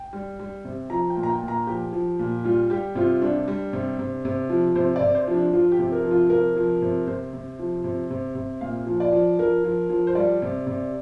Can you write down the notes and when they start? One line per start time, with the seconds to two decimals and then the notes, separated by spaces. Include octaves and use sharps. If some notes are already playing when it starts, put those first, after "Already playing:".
Already playing: G5
0.13 G3
0.39 G3
0.65 C3
0.90 F3 A#5
1.10 G5
1.17 A#2
1.23 A#5
1.29 G5
1.42 A#2
1.48 A#5
1.67 F3 G4
1.93 F3
2.19 A#2
2.44 G3 F4
2.70 G3 G4
2.95 C3 F4
3.22 G3 D4
3.48 G3
3.73 C3
3.99 C3
4.25 C3
4.50 F3
4.75 C3 C5
4.96 D5
5.01 C3
5.15 C5
5.28 F3
5.34 D4
5.53 F3 F4
5.72 G4
5.79 C3
5.92 A#4
6.04 F3
6.11 F4
6.30 C3 A#4
6.56 F3
6.82 C3
7.07 C3 C5
7.33 C3
7.59 F3
7.84 C3
8.10 C3
8.35 C3
8.61 A#2 F5
8.87 F3
9.00 D5
9.12 F3
9.38 F3 A#4
9.64 F3
9.89 F3
10.07 C5
10.15 G3 D5
10.42 C3
10.67 C3